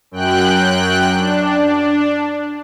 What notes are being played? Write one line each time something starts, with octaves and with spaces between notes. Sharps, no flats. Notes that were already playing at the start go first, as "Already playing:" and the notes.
F#2 G5 F#6
D4